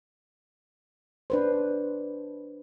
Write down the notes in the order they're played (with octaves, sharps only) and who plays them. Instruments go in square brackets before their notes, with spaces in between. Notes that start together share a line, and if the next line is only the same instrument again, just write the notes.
[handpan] D4 B4 C5